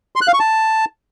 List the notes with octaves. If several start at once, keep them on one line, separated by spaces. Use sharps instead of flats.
C6
F#6
F5
C#6
A5